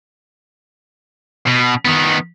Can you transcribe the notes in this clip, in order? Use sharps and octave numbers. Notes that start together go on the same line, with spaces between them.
B2
D#3 B3